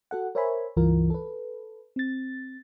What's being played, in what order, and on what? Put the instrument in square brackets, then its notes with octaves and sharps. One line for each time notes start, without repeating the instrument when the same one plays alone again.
[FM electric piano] F#4 A4 F#5
A#4 C5 C#5 E5 G#5 B5
C#2 G2 E3 F4 A#4
A4 B4
C4 A6